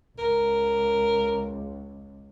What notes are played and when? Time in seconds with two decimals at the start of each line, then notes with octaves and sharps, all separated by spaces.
0.18 C#2 A#4